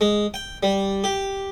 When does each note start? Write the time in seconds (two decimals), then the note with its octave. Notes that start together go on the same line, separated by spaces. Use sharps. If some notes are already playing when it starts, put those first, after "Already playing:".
0.01 G#3
0.34 G5
0.63 G3
1.04 G4